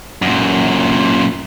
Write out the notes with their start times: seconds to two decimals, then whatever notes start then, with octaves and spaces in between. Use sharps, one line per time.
0.22 F#2 A#2